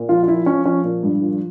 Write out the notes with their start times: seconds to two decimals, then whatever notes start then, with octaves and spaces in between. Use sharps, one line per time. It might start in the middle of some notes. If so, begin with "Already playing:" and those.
Already playing: A#2
0.09 F3 F4
0.23 F4
0.28 F3 E4
0.46 F3 C#4
0.65 F3 C#4
0.84 A#2
1.03 G2
1.22 F3